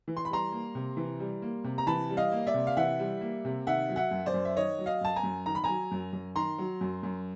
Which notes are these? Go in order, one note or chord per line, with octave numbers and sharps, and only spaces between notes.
E3
C6
B5
G3 A#5 C6
A#3
C3
E3
G3
A#3
C3
A#5
E3 A5 B5
G3
D#5 F5
A#3
D5 E5
C3
F5
E3 E5 F#5
G3
A#3
C3
D#3 E5 F#5
F#3
E5 F#5
F#2
C5 D5
F#2
E5
D#3 C#5 D#5
F#3
D#5 F5
F#2 A5
G#5 A#5
F#2
D#3 A#5
B5
F#3 G#5 A#5
F#2
F#2
D#3 A#5 C6
F#3
F#2
F#2